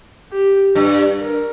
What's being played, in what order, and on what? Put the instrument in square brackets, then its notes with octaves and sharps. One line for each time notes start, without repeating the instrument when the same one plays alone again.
[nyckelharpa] G4
[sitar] G2
[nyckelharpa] A#4